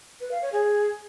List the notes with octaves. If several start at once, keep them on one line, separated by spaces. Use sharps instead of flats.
B4
F5
C#5
G#4